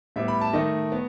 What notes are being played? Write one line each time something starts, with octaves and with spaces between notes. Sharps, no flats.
A2 G3 B3 E5
B5
A5
D#3 A3 D#5
B3